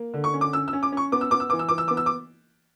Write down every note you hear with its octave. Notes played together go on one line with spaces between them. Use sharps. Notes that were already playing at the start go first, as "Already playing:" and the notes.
Already playing: A#3
D3
C#6
C#4
D6
C#4 E6
E6
C#4
D6
C#4 C#6
B3 D6
E6
B3 D6
E6
E3 D6
E6
E3 D6
E6
B3 D6
E6
D6